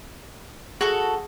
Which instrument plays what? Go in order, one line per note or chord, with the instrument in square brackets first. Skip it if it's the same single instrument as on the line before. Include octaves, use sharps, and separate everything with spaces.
[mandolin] F#4 A4 [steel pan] G#4